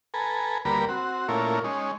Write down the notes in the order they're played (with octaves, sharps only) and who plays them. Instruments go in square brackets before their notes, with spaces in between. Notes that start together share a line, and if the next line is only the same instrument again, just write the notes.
[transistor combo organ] A4 B4 G#5 A#5
D2 G3 A#3 A#4 B4 B5
C4 F#4
A#2 A3 C#4 E4 F4 A#4
G#3 C#4 D#4